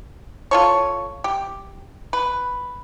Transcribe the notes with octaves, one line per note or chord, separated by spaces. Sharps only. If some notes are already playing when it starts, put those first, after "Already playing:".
F4 A4 C#5
G4
B4